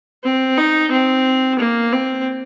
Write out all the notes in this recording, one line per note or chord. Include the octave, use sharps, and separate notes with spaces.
C4
D#4
C4
A#3
C4